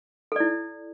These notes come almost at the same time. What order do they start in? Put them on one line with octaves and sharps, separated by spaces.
A4 D5 E4